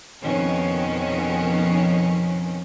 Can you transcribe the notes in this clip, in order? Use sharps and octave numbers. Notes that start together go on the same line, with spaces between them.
F2 B2 D#3 F3 C#4